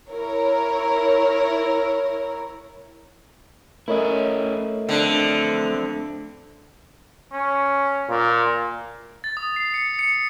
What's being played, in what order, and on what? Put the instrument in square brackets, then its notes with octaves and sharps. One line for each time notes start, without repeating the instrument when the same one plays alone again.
[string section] E4 A#4 C#5
[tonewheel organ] A3 [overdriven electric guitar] C#4 E4 [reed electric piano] A#4 C#5 D#5
[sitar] D3 [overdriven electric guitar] C4 A4
[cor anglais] C#4
[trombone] A#2
[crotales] A6
D#6
C7
C#7
C#7